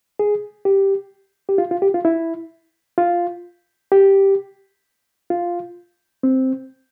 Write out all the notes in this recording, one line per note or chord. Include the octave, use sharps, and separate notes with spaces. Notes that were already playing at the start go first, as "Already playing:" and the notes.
G#4
G4
G4
F4
F4
G4
F4
E4
F4
G4
F4
C4